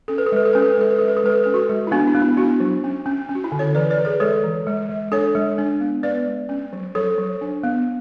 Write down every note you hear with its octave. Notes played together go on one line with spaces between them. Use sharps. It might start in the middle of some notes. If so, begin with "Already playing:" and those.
C#4 A4
B4
A4
G#3 B4
A4
C#4 B4
A4
B4
G#3 A4
B4
G#3 A4
B4
A4
G#3 B4
A4
C#4 B4
F#4 A4
G#3
E4
B3 D4 F#4
E4
B3
E4
B3 D4 F#4
F#3
C#4
C#4
C#4
F#4
E4
D3
A4 C#5
E3 B4 D5
B4 D5
E3
G#4 B4
G#3 A4 C#5
E3
G#3
G#3
D4 A4 C#5
G#3
D4
B3
B3 B4 D5
G#3
C#4
F#3
F#3 A4 C#5
F#3
D4
B3